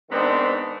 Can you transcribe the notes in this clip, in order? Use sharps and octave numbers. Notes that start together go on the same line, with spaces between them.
G#2 D#3 B3 C4 D4